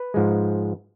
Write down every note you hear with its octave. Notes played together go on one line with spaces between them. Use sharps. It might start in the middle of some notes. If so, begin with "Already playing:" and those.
Already playing: B4
G#2 F3 G#3